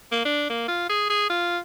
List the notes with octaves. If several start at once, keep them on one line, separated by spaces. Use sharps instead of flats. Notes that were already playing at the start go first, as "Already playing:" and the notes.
A#3
D4
A#3
F4
G#4
G#4
F4